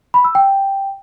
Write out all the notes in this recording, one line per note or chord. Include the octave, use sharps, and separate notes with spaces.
B5
E6
G5